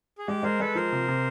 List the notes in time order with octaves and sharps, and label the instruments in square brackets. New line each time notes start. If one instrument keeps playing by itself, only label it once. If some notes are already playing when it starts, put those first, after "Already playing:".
[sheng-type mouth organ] G#4
[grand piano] G#3 [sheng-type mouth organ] G4
[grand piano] G#3 [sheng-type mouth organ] A#4 C5
[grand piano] G#3 [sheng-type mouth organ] A4 B4
[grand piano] F3 [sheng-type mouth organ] A#4 C5
[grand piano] C3
C3